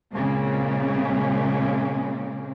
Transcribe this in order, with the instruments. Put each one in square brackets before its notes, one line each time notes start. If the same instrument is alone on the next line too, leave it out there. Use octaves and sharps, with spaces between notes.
[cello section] A#2 C#3 G#3 A#3 C4